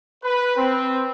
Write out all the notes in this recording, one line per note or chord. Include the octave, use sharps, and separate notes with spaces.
B4
C4